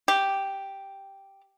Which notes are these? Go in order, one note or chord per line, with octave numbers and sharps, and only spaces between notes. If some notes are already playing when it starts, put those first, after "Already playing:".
G4